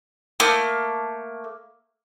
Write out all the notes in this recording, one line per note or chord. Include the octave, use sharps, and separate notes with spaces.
A3 A#3